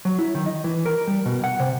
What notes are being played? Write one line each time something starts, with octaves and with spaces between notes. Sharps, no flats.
F#3
E4
D#3
D#5
E3
A#4
G3
B2
F#5
C3